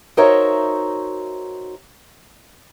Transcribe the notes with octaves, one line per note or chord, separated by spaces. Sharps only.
D#4 F#4 A#4 C5 C#5 E5